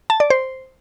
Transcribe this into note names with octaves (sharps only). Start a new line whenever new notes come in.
A5
D5
C5